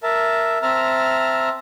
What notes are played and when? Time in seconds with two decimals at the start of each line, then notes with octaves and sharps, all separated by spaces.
0.03 A#4 E5 A5
0.62 C4 E5 A5 A#5 F6